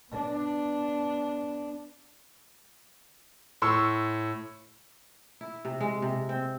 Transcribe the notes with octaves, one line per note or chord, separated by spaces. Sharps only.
B3 D4
A2 C6 C#6 E6
E4
C3
G#3
C3
C4